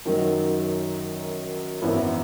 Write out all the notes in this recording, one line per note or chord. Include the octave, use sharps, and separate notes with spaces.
F#2 D#3 F#3
G#1 F#2 E3 B3 E4